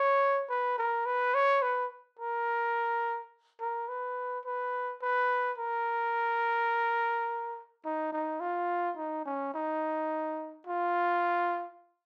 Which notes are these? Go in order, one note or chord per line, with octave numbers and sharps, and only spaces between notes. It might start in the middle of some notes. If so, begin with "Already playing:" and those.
Already playing: C#5
B4
A#4
B4
C#5
B4
A#4
A#4
B4
B4
B4
A#4
D#4
D#4
F4
D#4
C#4
D#4
F4